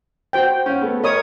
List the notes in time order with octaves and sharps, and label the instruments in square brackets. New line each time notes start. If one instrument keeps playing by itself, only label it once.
[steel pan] F#4 C5 G5
[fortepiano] C#4 F#5
A3 B3
[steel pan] A#4 C#5 D#6 [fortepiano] D#5